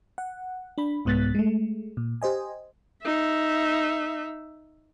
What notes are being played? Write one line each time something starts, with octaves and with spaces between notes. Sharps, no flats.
F#5
D4 B5
C2 G#2 B3 F#6 A6 B6
G#3 A3
A#2
G4 C5 D#5 G#5
D#4 E5